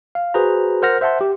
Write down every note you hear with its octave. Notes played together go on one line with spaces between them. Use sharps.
F5
F#4 G#4 B4 C5 A#5
A#4 C5 F#5 F6 A#6
C5 E5 F#5 A5 C6
G4